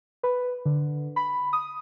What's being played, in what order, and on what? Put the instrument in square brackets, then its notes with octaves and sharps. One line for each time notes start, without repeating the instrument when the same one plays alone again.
[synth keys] B4
D3
B5
D#6